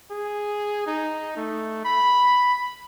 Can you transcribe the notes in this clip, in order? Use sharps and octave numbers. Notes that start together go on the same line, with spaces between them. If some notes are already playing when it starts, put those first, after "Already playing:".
G#4
D#4
A3
B5